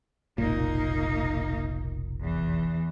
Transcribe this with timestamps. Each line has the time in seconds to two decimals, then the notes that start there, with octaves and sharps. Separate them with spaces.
0.38 F1 B1 A#2 A#3 D#4
2.21 E2 E3